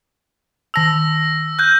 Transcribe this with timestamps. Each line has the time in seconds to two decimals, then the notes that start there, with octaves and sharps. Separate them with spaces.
0.74 D#3 A5 E6 A#6 F7
1.59 F#6 G6